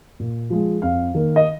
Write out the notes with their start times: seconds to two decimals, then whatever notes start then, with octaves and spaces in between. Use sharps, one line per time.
0.20 A#2
0.50 F3 G#3
0.82 F2 F5
1.14 D#3 A#3
1.36 D#5